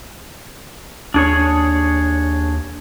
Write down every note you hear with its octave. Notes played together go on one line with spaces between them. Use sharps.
D#2 D4 G#4 C#5